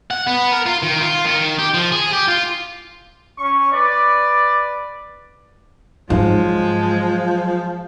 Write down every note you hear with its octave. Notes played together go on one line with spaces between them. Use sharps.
F#5
B3
A#4
F4
D#3
F4
D#3
G4
F3
G#4
G4
F4
C#4 C#6
B4 D5
G#2 F3 F#3 G#3